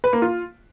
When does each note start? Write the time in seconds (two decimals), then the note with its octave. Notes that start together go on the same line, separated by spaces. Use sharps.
0.04 B4
0.13 A#3
0.22 F4